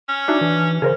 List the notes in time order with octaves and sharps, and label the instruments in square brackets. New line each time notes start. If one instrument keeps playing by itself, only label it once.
[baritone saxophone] C#4
[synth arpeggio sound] D4 F#4 E5 [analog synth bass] D#4
[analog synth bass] E3
[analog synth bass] C#3 [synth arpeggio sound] G#4 A#4 C5